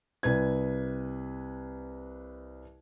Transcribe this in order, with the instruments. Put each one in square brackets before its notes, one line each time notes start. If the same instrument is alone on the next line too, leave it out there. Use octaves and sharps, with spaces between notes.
[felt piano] C2 B4 G#6